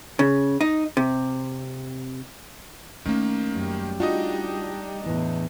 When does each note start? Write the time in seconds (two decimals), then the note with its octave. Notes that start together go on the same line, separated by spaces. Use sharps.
0.19 C#3
0.61 D#4
0.97 C3
3.05 D#3 A3 A#3 C#4
3.55 F#2 G3
4.00 D4 D#4 F4 F#4 D#5
5.06 E2 A2 E3